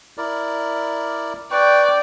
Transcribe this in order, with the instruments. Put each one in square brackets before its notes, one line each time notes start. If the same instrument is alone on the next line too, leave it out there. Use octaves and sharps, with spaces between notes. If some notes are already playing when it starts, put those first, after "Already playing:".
[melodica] E4 A#4 D5
[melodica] B4 C#6 [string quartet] D5 G5